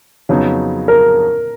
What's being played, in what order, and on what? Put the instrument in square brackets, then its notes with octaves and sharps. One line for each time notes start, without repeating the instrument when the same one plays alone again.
[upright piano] F2 C#3 F#3 B3 D#4
[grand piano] A#4